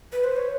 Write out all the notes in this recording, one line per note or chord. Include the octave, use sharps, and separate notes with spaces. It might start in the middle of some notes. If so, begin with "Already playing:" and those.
B4
C5
C#5